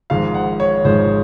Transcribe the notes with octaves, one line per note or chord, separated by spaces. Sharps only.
G#1 G#2 F3 G#3 F5
F#5
C#5
G#1 G#2 F3 G#3 C5